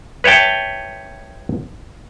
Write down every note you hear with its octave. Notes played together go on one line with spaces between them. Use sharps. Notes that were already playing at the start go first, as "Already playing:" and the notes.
B4 C#5 E5 G5 A5